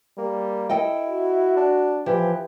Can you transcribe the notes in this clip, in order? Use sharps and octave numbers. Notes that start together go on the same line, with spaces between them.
G3 A#3
E4 A4 D#5 G5
F#4
D4
E3 F3 G4